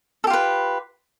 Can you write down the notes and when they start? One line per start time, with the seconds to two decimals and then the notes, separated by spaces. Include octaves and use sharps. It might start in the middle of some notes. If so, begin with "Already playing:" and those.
0.24 A4
0.27 G4
0.30 F4
0.33 B4